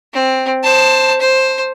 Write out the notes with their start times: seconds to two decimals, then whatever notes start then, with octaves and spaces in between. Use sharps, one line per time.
0.13 C4
0.63 C5 A5
1.21 C5